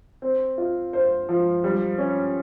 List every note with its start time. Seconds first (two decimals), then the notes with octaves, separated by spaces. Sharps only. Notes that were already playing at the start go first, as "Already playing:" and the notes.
0.22 C4
0.58 F4
0.93 C5
1.29 F3
1.64 G3
1.98 C#4